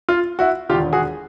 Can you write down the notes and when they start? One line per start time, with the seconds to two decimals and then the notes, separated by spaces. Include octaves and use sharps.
0.09 F4
0.39 E4 F#4
0.69 E1 D#2 D3 F4 G4
0.93 F#4 G#4